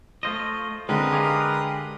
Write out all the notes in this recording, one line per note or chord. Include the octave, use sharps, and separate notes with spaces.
A3 F4 C5 D#5
D3 G#3 C4 A#4 B4 D#6
G4 G#4 F5